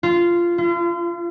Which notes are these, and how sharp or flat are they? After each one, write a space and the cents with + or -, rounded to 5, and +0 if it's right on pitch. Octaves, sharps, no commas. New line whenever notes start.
F4 -15
F4 -40